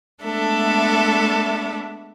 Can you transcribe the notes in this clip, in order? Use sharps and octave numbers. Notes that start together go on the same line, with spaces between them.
G#3 A3 B3 D4 A4 E5